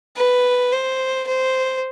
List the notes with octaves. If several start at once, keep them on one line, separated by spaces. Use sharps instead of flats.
B4
C5
C5